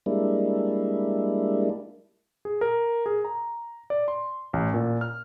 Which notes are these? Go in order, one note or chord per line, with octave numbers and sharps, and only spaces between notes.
G3 G#3 A#3 D4 E4
G#4
A#4
G#4
A#5
D5
C6
A1
A#2
F6